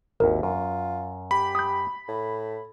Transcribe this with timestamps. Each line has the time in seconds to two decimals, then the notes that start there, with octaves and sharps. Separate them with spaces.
0.20 G#1 D#2 E4 A#4
0.43 F#2 F4
1.31 G4 B5
1.55 D#6 G6
2.08 A2